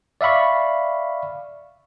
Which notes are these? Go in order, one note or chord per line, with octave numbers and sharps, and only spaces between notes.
D5 E5 F5 B5 C#6